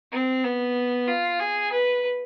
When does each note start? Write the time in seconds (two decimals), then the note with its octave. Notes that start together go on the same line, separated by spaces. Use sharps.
0.12 C4
0.44 B3
1.08 F4
1.40 G#4
1.72 B4